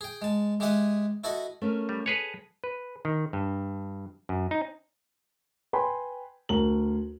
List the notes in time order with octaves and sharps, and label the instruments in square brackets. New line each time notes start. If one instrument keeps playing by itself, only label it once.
[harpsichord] G#4 G5
G#3 A5
G#3 G4 G#4 E5 F#5 G#5
E4 F#4 A4 D#5 F#5
[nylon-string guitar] A3 C#4 A#4
[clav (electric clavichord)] G3
[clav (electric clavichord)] G#4 B4 C#5 [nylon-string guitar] A4 G#5
[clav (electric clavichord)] B4
D#3
G2
F#2
D#4
[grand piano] B4 G5 G#5 B5 C6
D2 A#4 F#7